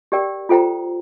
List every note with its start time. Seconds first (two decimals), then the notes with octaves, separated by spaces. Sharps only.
0.12 G4 A#4 D5 G5
0.49 F4 A4 C5 G5 A#5